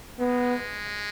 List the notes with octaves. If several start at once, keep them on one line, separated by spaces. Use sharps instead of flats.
G#3 B3